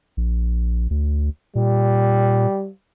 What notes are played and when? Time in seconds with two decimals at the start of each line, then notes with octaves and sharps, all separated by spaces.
0.17 A#1
0.91 D2
1.55 A#2 G3